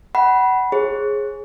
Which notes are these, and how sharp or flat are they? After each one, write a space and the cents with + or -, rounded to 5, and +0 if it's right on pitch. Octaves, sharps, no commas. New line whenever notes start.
F#5 +25 B5 -15
G#4 +0 C#5 -40